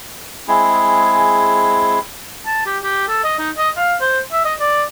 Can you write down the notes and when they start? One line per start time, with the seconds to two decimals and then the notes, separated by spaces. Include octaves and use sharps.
0.48 G#3 C4 E4 G#4
2.46 A5
2.66 G4
2.83 G4
3.08 A4
3.24 D#5
3.39 D#4
3.57 D#5
3.77 F5
4.01 C5
4.32 E5
4.45 D#5
4.60 D5